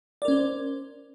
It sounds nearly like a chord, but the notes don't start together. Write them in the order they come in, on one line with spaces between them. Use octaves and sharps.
D5 A#4 C#4 C5